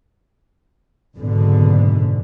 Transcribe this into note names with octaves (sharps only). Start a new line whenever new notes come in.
F#1 G#2 B2 D3